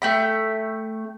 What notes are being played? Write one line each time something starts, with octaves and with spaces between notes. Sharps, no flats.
A3 G5 B5